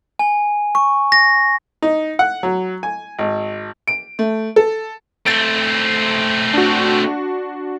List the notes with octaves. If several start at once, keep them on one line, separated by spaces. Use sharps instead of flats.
G#5
C#6
A#6
D#4
F#5
F#3
G#5
G#1
D7
A3
A4
A3 C4 A6 D7
D4 F#4